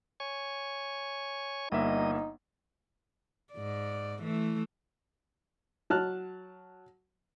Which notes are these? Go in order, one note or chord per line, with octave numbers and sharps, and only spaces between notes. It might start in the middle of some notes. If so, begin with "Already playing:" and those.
C#5 G#5 C#6
G1 G3 A#3 D#4 D#5 E5
G#2 D5
E3 A3
F#3 A5 F6 F#6